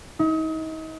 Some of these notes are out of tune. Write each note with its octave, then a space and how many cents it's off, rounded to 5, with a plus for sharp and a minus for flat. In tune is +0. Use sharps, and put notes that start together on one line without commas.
D#4 +35